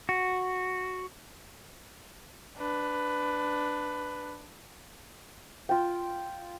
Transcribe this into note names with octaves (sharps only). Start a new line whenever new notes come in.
F#4
D4 B4
F4 G5